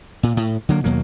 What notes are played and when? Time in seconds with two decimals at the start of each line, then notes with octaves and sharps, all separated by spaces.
0.23 A#2
0.37 A2
0.69 D3 F#3 A#3
0.84 D#2 B2 F#3 A#3